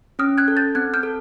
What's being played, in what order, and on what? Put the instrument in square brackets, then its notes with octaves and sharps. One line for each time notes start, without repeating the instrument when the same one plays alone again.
[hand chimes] C#4 [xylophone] D#6 F6
[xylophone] F#6 G#6
[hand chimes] A4
[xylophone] G6 A6
[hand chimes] C4 [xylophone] F#6 G#6
[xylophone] F6 G6
[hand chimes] A4